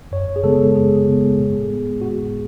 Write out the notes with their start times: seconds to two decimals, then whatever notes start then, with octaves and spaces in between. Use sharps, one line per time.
0.12 F#2 C#5
0.36 G#4
0.43 C#3 G#3 B3 A4
0.75 F#2 G#4
1.07 C#3 G#3 B3
1.39 A2
1.70 G#3 B3
2.01 A2 F#4